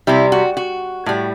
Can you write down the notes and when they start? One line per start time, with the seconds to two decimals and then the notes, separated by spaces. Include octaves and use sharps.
0.07 C3 G3 E4
0.32 F#4
0.57 F#4
1.06 A2 G3